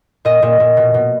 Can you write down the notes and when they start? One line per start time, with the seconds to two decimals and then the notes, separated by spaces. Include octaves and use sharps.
0.25 A#2 D#5
0.42 A#2
0.60 A#2
0.77 B2
0.94 B2